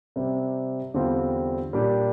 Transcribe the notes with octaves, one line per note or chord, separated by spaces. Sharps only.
C3 G3 C4
E2 D3 G3 C4 F4
A#2 G3 D4 G4